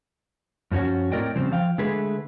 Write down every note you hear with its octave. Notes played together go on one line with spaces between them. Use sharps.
F#2 F3 C#4 F#4
A2 C4 A#4 D5 D#5 G5
C#3 F3 G3 C4
F3 F5 G5
D3 G#3 A3 G#4 B4